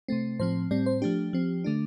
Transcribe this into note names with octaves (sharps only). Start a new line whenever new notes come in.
C3 A3 C4
A2 F3 C4 C5
A2 G3 C4 D5
C5
F3 A3 D4 G4
F3 C4
D3 A3 D4